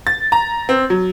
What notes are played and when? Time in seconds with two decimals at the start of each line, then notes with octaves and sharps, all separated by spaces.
0.07 A6
0.32 A#5
0.69 C4
0.90 F#3